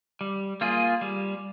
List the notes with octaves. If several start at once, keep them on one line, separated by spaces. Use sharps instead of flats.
G3
A#3 F4 G#4
G3